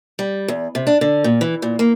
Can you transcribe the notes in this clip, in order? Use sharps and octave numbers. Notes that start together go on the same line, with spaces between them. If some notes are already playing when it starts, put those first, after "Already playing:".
G3
E2
C3
D4
D3
A#2
E3
A#2
A#3